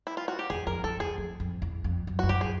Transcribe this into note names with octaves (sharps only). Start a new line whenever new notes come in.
E4
F4
F#4
G4
E2 G#4
F2 A#4
F2 A4
E2 G#4
F2
F2
E2
F2
F#2
G2 F#4
F#2 G4
G#4